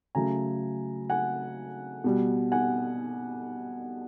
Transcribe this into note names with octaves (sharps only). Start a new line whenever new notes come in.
C#3 F#3 A3 G#5 A#5
F#5 G#5
B2 G3
F#5 G#5